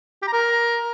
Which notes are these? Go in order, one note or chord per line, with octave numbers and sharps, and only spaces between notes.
G4
A#5
A#4